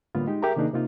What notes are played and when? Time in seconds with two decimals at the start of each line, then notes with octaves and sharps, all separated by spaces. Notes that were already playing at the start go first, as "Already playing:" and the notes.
0.15 A2 D3 G3 A#3 B3 F4
0.27 G#3 D#4 G4
0.42 G4 G#4 A#4 E5 A#5
0.56 C3 D#3 A#3 D4 D#4 G#4
0.73 C3 A#3 D#4 F4